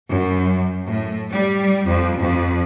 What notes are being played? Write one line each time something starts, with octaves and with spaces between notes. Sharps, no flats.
F#2
A2
G3
F2
F2